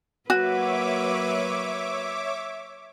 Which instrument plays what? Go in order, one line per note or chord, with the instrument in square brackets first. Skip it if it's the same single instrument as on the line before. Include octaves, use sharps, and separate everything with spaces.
[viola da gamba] F#3 A#3 B4 [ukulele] F#4 [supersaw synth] C#5 E5 D6